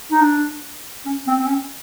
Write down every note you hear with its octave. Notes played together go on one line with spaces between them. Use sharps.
D#4
D4
C#4
C4
C4
C#4